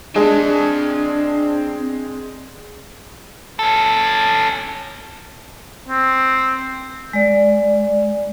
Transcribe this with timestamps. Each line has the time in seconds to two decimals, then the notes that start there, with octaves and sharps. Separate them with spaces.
0.16 G#3 C4 D4 G#4 A5
3.59 C#4 A4
5.89 C4
7.13 G#3 D5